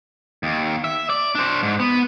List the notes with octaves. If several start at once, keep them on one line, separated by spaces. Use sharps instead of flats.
D#2
E5
D5
D4 C5
G#2
B3